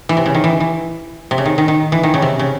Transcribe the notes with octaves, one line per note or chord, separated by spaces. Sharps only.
E3
C3
C#3
D#3
E3
E3
C3
C#3
D#3
D#3
D#3
E3
D#3
C#3
C3
C#3